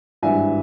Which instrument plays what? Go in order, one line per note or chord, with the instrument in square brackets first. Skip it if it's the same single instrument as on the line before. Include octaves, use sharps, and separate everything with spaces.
[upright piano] G#1 G2 E3 G3 E5 G#5